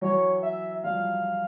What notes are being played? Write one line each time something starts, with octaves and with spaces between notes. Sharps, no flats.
E3 F#3 C#5
E5
F3 G3 F5